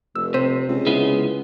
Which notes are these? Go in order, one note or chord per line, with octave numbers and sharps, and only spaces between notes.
F1 E6
C3 C5
C#2
C#3 G#3 B3 E4